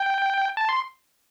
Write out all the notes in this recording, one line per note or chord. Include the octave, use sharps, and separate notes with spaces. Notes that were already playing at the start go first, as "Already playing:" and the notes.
Already playing: G5
A5
C6